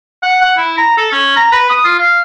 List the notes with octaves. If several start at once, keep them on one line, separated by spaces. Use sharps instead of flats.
F#5
F#5
E4
A#5
A4
C#4
A#5
B4
D#6
F4
F5